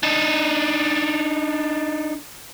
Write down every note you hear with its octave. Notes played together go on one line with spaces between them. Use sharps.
D4 D#4